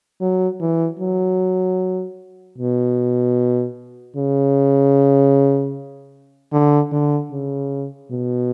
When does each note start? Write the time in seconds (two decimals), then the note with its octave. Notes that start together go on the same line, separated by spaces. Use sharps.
0.21 F#3
0.60 E3
1.00 F#3
2.58 B2
4.17 C#3
6.53 D3
6.92 D3
7.32 C#3
8.11 B2